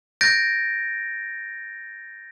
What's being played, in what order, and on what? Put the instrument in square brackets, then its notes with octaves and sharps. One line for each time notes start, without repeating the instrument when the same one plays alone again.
[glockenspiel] G6 A6 A#6 D7